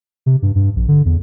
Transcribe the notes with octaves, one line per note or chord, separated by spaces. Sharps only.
C3
G2
G2
A#1
D3
E2